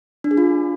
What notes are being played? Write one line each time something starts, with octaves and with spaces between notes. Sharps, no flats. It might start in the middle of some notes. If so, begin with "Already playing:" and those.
D4
G#4
F4